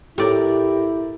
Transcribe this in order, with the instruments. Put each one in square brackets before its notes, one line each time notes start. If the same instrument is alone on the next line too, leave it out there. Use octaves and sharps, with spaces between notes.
[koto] A2 D5 [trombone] E4 [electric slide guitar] G4 A#4